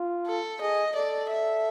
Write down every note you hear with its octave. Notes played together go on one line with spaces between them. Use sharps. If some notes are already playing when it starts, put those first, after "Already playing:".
Already playing: F4
A4
G#4 D#5
A4 D5
E5